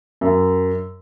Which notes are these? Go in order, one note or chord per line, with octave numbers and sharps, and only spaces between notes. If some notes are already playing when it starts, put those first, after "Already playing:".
F#2